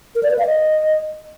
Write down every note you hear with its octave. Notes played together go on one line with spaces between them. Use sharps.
A#4
D5
B4
F5
D#5